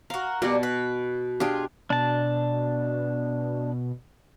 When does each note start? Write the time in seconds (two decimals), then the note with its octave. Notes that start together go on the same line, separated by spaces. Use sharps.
0.10 F#4 A#4 F5
0.42 B2 G3 A#3 D4 F#4
0.63 B4
1.40 D4 F4 G4 G#4
1.90 B2 D4 A5